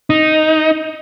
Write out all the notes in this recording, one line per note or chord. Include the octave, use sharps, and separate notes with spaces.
D#4